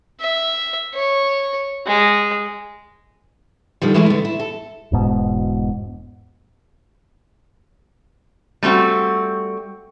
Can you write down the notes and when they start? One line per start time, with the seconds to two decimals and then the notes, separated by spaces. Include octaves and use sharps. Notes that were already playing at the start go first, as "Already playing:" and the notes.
0.20 E5
0.94 C#5
1.86 G#3
3.82 D3 D#3 F3 G3
3.94 E3 G#3 A3 E4 G#4 A#4
4.06 D3 B3
4.25 E4
4.39 A4
4.92 E1 G#2 B2
8.63 G3 A3 C4 F#4